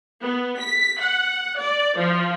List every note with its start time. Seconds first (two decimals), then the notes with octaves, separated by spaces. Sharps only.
0.21 B3
0.59 B6
0.99 F#5
1.59 D5
1.97 F3